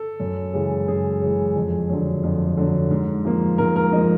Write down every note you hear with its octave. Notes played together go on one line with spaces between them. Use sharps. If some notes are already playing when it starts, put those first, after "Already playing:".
Already playing: A4
F#2
C#3 E3 G#3
F#2 G#4
C#3 E3 G#3
F2
D3 F#3
F2
D3 F#3
G#2
F3 A#3
G#2 A#4
A#4
F3 A#3 D#5